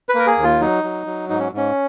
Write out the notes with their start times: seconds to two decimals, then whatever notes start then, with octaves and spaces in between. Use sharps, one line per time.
0.09 B4
0.15 A#3 A#4
0.27 G#4
0.37 D#2
0.43 F4
0.60 F#3 D#4
0.84 F#3
1.07 F#3
1.29 G#2 D#4
1.39 C#4
1.53 G#2 C#4